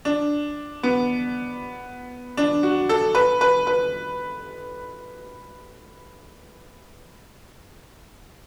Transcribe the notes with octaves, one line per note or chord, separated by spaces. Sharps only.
D4
B3
D4
F#4
A4
B4
B4
B4